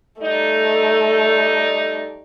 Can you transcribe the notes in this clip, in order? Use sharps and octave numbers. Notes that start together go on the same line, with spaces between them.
G3 A3 D#4 D5